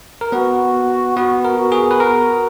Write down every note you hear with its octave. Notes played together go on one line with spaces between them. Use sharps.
A#4
B3 F#4 B4
B3 F#4 B4
A#4
F#4
G#4
B4
F#4 A#4